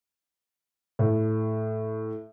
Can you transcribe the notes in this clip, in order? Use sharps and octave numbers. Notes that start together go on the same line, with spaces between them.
A2